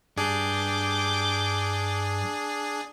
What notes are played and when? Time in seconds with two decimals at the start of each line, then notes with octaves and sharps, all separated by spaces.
0.17 G2 D4 G#4 D6 G6